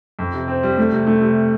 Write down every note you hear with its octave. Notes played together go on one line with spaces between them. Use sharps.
F2
C3
C4
G3
A3
C3
A3
C3